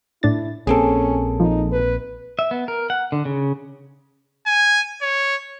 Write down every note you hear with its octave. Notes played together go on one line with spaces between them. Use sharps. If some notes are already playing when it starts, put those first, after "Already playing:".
A2 D4 E4 A6
A#1 A#3 C4 C#4 G#4 A4
F3 D#4
B4
E5
B3
A#4
F#5
D3
C#3
G#5
C#5